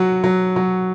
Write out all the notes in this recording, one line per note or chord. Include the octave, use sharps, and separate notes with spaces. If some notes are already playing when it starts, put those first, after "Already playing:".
Already playing: F#3 F#4
F#3
F#3